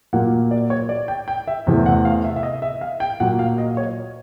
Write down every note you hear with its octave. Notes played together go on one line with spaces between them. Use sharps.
A#2 F#3 A#3 F#5
D5
C#5
D5
G5
G5
E5
E2 C3 E3 A3
F#5
F5
E5
E5
D#5
E5
F5
G5
A#2 F#3 A#3 F#5
F5
D#5
C#5